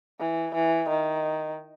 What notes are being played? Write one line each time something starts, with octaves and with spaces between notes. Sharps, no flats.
E3
E3
D#3